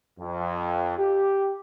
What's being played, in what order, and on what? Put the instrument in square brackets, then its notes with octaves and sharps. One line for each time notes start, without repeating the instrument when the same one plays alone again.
[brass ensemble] F2
G4